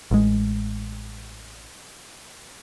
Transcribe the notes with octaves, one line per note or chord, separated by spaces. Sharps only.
A1 G#3